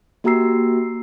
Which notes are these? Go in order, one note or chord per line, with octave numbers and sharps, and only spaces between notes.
A#3 F#4 G4 A#5 E6 C7